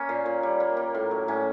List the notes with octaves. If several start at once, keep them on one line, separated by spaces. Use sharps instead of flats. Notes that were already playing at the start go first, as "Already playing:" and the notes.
Already playing: A#3 C#4
A#2
A#2
G3
A#3
A#3
A2
F#3
A2 C#4